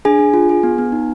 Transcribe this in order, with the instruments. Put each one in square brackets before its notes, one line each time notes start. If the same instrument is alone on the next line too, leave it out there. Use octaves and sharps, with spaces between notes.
[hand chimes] D4 G#4 G#5
D4
F4
G#4
B3
B3
D#4